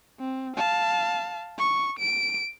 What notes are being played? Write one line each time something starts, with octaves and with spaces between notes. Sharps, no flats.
C4
F5 A5
C#6
D7